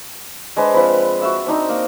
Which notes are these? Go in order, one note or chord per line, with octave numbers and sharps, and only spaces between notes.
G#3 D4 B4 C5
F3 C4 B4 B5
F#4 E5 E6
C4 D4 D#4 C5
A#3